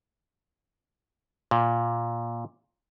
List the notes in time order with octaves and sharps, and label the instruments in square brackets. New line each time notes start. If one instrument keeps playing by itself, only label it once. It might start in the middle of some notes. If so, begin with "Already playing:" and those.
[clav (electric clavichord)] A#2